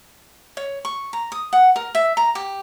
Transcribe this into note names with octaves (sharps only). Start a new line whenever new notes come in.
C#5
C#6
A#5
D#6
F#5
A#4
E5
A#5
G4